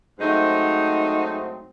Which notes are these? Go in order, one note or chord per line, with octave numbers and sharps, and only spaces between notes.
G#2 F#3 A3 C4 D#4